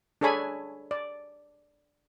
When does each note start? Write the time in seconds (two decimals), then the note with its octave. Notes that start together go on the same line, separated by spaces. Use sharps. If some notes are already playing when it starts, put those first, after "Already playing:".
0.21 D4 G#4 A4 C#5 G#5 B5
0.91 D5